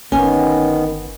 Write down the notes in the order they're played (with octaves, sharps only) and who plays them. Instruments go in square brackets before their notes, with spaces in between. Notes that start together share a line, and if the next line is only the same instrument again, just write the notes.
[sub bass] G1 [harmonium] D#3 B3 [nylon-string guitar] C#4 [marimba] G#5